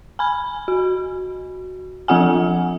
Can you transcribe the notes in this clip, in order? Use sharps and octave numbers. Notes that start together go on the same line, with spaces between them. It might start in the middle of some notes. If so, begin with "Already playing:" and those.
G#5 B5
F#4
F3 C4 F4 F#5 G#5